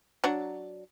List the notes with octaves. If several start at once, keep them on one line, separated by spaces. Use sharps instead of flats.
F#3 D4 F#5